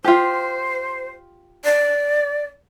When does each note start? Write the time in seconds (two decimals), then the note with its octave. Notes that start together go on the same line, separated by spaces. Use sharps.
0.04 F4 G4 C5
1.64 D5